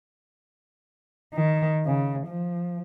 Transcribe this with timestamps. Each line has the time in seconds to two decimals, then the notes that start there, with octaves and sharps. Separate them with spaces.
1.33 D#3
1.85 C#3
2.27 F3